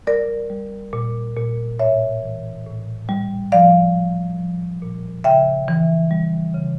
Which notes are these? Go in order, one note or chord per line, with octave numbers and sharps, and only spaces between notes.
G3 A#4 D5
G3
A#2
A#2
A2 C#5 E5
E3
A2
G3
F3 D5 F5
F3
F3
A#2
C#3 E5 G5
E3
G3
C#3